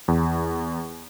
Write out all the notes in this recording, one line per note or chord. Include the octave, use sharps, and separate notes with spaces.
E2